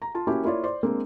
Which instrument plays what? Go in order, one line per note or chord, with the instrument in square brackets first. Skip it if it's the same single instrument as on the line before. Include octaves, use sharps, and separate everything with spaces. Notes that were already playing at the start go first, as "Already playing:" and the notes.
[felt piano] A#5
F4 A5
A#3 C#4 E4 F#4 G4
A#3 E4 F4 C#5 D5
C5 D5 C6
G#3 A#3 C4 D4